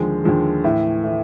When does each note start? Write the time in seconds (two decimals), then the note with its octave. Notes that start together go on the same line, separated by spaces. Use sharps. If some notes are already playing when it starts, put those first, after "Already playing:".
Already playing: D#2 D3 F3 G#3
0.24 D#2 D3 F3 G#3
0.64 A2 E3 A3
1.04 E3 A3